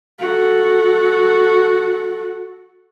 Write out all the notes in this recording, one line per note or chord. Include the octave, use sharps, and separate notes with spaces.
F#4 A4